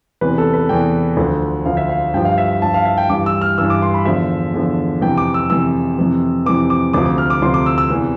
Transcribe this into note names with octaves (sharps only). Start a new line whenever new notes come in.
E2 C3 E3 B4
A4
B4
E2 C3 E3 G5
D2 D3 F3
D2 D3 F3 F5
E5
F5
G2 F3 G5
F5
E5
G2 F3 A5
F5
E5
G5
G2 E3 D6
E6
F6
G2 E3 E6
D6
C6
B5
E2 D3 F3 E5
E2 D3 F3
F2 C3 E3 G5
D6
E6
F2 C3 E3 E6
F2 C3 E3
F2 C3 E3 D6
D6
D2 C3 F3 D6
D6
F6
D6
D2 C3 F3 C6
D6
E6
E6
E2 C3 E3